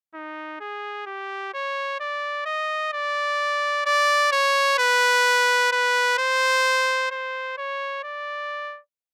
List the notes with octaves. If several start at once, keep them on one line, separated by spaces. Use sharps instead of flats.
D#4
G#4
G4
C#5
D5
D#5
D5
D5
C#5
B4
B4
C5
C5
C#5
D5